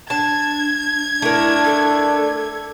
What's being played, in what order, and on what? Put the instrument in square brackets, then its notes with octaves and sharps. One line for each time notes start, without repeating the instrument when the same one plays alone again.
[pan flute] D4 [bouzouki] A5 [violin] G#6
[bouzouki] A3 A#4 [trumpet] D4 [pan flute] E4
[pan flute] A4